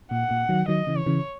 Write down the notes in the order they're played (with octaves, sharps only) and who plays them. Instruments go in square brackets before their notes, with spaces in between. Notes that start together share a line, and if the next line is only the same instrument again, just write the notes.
[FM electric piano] A#2 [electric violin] F#5
[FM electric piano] A#2
D#3 F#3
[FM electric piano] D#3 F#3 [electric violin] D#5
[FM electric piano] C#3 E3
[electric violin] C#5
[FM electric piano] C#3 E3